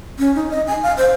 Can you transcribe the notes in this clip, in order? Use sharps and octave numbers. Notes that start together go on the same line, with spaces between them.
C#4
D#4
D#5
G#5
F5
C5